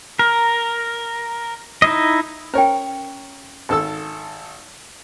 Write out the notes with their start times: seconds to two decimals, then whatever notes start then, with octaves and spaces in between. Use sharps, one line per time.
0.19 A#4
1.82 D#4 E4 D#5
2.54 C#4 A#4 C#5 G5
3.69 G#1 A4 E6